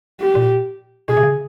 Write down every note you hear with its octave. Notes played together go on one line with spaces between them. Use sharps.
G4
A#2
B2 G#4
C3
C#3